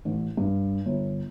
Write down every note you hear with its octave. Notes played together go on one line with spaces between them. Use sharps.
A1
G2
G1